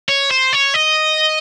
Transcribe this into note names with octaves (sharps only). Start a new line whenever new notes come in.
C#5
C5
C#5
D#5